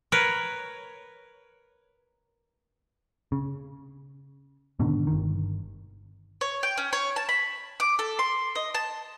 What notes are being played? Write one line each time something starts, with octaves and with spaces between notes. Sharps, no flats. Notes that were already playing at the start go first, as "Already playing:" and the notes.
A#4 B4 C#5
C#3
G#2 B2 D3 D#3
G1 D#3
C#5
G5
C#4
C#5
A5
B5
D6
A4
C6
D#5
A5